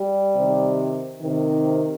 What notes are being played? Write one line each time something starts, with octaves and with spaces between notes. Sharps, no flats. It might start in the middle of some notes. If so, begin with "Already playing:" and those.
Already playing: G3
C3 D#3
C3 D#3